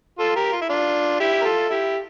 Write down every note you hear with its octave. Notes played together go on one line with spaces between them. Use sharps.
F4 A4
G4 A#4
F4
E4
D4 F4
E4 G4
A#4
F4 A4
E4 G4